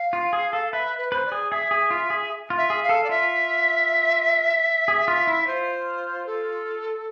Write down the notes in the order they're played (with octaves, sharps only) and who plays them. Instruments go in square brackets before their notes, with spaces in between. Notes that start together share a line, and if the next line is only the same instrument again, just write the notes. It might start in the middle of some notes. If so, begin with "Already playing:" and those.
Already playing: [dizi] F5
[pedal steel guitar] F4
G#4
A4
[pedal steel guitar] B4 [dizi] E5
[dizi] B4
[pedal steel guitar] B4 [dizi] C5
[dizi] D5
[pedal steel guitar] G#4
[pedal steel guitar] G#4 [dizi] E5
[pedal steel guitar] G#4
F4
G#4
F4
[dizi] E5
[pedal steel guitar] G#4
[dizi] F5
[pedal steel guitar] A4
[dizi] D5
[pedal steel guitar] F4 [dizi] E5
[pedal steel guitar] G#4
F4
E4
[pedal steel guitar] F4 [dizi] C5
[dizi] A4